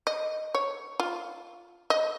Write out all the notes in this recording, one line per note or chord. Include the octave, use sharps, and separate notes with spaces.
D#5
C#5
F4
D#5